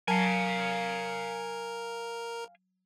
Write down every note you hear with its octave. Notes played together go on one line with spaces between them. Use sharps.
F#3 A#4 F5 G#5 A5 G#6